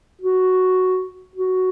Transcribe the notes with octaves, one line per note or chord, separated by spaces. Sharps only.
F#4
F#4